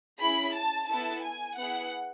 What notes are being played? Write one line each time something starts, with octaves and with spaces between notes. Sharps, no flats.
C#4 E4 G#4 B5
A5
B3 E4 A4 A5
G#5
B3 E4 G#4 F#5